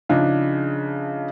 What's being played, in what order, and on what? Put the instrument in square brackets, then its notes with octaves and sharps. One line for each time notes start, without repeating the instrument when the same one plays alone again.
[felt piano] C#3 F3 D4 D#4